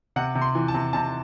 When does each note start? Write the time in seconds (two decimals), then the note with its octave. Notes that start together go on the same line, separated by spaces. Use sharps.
0.16 C3 F#5
0.35 C3
0.41 C6
0.55 E3
0.68 A5
0.74 C3
0.93 C3 A5